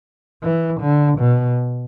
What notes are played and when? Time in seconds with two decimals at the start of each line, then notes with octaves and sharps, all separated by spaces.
0.43 E3
0.81 D3
1.19 B2